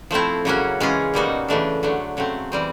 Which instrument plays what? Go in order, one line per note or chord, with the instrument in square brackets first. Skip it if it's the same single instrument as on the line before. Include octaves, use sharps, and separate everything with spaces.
[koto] F3 A3 C4 E4
C#3 F#3 A#3 C#4 F#4
E3 G#3 C#4 F4 G#4
B2 G3 A#3 D#4 F#4
C#3 E3 A3 D4
D3 F#3 A3
C#3 F#3 A3 C4
E3 G3 C4